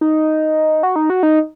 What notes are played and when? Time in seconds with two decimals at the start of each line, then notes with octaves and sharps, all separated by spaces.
0.01 D#4
0.83 F#4
0.96 D#4
1.10 F#4
1.23 D#4